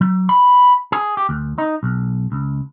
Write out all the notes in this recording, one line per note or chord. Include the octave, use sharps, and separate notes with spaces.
F#3
B5
G#4
G4
D2
D#4
B1
C#2